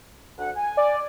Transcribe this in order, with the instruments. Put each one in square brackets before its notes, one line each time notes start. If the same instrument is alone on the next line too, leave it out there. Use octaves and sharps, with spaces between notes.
[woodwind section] D2 F#5
G#5
[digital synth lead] D5